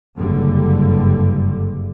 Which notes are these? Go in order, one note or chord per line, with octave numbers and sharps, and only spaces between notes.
F#1 G2 D3 G3